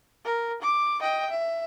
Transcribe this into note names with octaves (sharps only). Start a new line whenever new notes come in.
A#4
D6
D#5 G5
E5